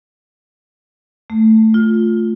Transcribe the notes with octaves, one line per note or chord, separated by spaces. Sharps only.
A3
F4